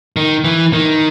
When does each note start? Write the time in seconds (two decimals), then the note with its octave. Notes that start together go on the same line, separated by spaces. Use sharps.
0.16 D#3
0.44 E3
0.73 D#3